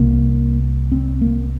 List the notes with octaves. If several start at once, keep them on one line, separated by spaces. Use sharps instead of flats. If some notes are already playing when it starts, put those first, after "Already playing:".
Already playing: C2 C3 A#3
C4
A#3